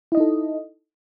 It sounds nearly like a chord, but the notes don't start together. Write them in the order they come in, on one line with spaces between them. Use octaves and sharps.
E4 D#5 D#4 A4